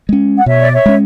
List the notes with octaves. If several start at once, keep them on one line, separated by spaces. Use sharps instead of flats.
G#3 C#4
F#5
B2 C#5 E5
D5
C#5 E5
G#3 C#4